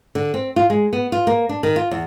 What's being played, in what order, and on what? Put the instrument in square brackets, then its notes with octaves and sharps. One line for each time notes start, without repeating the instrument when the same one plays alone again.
[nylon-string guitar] D3
C4
F4
G#3
B3
F4
A#3
D4
D#3
F4
E2